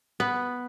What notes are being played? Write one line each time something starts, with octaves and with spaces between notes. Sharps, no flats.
B3